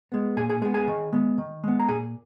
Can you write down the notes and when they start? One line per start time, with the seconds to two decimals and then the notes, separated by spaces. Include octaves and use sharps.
0.12 G#3 B3
0.37 A#2 G#4 G#5
0.49 G#4 G#5
0.62 G#3 G#4 G#5
0.65 B3
0.74 G#4 G#5
0.88 D#3
1.12 G#3 B3
1.38 D#3
1.64 G#3 B3
1.79 A#5
1.88 A#2 G#4 G#5